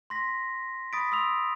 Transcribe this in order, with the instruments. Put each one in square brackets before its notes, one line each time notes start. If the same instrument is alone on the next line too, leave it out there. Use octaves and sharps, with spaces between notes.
[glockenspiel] C6 A#6 B6
B5 D#6 A6 B6 D7
C6 D#6 E6 D7 F7